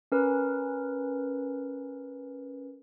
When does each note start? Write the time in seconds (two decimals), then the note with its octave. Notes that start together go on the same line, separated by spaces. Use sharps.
0.12 C#4 A#4 B4